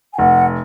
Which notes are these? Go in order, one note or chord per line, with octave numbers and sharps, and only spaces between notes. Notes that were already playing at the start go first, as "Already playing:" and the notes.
G#5
F1 F#5